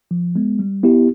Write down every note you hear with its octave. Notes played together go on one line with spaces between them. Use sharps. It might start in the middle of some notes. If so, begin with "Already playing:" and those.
F3
G#3 B3
G3
B3 E4 G4